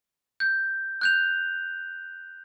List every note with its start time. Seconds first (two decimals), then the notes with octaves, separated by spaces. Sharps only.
0.40 G6
1.01 F#6 G6 F7